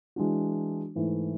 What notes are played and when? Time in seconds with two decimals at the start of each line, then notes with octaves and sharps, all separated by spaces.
0.16 E3 G#3 D4 F#4
0.95 G#2 E3 A3